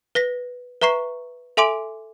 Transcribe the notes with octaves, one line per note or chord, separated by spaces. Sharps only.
B4 A#6 B6
B4 E5 A#5 C#6 C7
A4 E5 G#5 C6 D6 D7